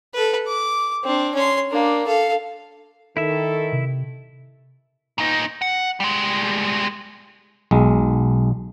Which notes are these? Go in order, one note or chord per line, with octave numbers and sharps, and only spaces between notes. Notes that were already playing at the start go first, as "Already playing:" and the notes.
A4 B4
D6
C4 D4
C#4 C6
A#3 D4
A4 F5
D#3 E4 A4 E5
C3
A#2 D#4
F#5
G3 G#3
B1 G#3